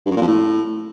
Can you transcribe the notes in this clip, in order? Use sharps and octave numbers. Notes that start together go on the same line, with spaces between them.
G2
F#2
A#2
F2
A2